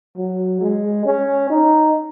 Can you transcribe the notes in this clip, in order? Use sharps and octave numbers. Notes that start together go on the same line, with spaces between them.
F#3
G#3
C#4
D#4